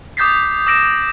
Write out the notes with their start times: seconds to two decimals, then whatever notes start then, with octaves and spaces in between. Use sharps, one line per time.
0.17 D6 D#6 G6 A6 B6 C7
0.67 D6 E6 A#6 D7 E7